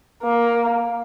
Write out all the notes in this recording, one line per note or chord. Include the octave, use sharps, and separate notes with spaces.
A#3